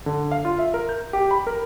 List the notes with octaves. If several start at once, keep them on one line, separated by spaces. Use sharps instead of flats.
D3
F5
F4
E5
A#4
G6
G4
B5
A#4